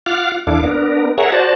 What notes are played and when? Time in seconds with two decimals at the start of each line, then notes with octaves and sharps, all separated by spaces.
0.06 F4 F5 F#5 D6 F6
0.47 E2 D4 E4 A4 F5 D6
0.64 B3 D4 A#4
1.18 G#4 A#4 C#5 E5 F#5
1.32 F#4 C5 D5 A5